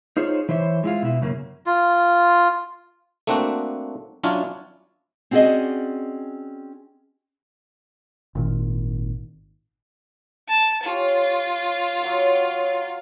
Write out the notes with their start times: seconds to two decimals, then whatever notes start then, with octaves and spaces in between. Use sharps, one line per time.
0.17 D#4 F4 G#4 C5 C#5
0.49 E3 E4 C5 C#5 E5
0.84 G#3 E4 F4
1.02 B2 E4
1.22 F#2 C#3 A#3 C#4
1.66 F4
3.27 A3 A#3 C4 D4 F#4
4.24 F#3 C#4 D4 E4 F4
5.31 C4 C#4 F#4 G#4 D5 D#5
8.35 G#1 A#2 D#3
10.49 A5
10.85 F4 G4 C#5 G#5
12.01 F#3 F#4 F5
12.37 C#5